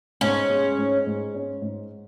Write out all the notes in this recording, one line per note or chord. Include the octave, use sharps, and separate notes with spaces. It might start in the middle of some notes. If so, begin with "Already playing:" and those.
G#2 C#4
G#3
G#2
G#2
C#4
G#2